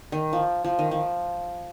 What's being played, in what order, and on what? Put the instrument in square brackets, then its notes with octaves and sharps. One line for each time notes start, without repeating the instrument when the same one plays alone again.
[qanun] D#3
F3
F3
D#3
F3